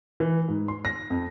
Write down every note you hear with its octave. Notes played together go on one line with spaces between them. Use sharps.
E3
G#2
C6
A#6
F2